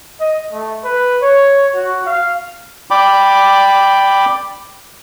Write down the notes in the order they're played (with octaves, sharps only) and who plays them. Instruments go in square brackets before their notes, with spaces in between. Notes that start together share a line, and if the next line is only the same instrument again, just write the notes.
[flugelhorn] D#5
A3
B4
C#5
F#4
F5
[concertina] D5 G5 B5 D6